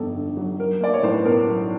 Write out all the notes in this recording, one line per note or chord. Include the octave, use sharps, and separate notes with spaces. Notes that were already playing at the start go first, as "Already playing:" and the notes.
Already playing: G1 F2 A4
D3
F#3
F#3 A#4
A#3 D5
C#5
A2 C5
B4
B1 A#4
F#3